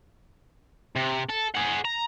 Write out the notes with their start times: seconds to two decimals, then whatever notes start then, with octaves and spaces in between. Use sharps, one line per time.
0.96 C3
1.29 A4
1.55 G#4 F#5
1.85 A#5